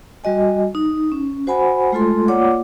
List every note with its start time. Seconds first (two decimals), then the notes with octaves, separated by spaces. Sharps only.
0.24 G3 F#4 D#5 G#5
0.75 D#4
1.12 C#4
1.47 F#4 C5 F#5 G#5 B5
1.92 G#3 A3 F4 A4 C6
2.28 A#3 F4 C#5 D5 F#5 D6